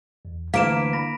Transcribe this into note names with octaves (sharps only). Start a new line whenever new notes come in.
E2
D2 E3 A#3 F5 B6 D7 E7
B5 A#6